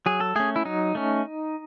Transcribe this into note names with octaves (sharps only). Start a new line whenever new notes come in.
F#3 G#4
A4
A3 C#4 G#4
E4
F#3 D#4
A3 C#4